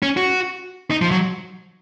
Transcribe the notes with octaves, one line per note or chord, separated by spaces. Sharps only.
C#4
F#4
D#4
F3
F#3